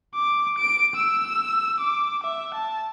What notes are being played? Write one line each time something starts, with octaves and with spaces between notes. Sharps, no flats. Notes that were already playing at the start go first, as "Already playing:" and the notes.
D6
D7
E6
D6
E5
A5